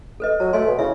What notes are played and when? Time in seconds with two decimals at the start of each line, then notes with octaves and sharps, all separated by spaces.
0.20 A4 B4 D#5
0.40 F#3 A5
0.53 A3 D5 G#5 C6
0.67 B2
0.79 C#3 E4 E5